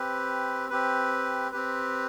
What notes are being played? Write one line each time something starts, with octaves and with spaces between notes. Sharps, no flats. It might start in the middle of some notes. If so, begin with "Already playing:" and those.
Already playing: C4 G4 B4
C4 G4 B4
C4 G4 B4